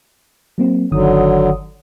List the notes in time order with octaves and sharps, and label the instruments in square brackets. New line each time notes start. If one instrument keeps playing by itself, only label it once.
[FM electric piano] F#3 A#3 C4
[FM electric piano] G1 D#3 D#6 [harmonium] D3 F#3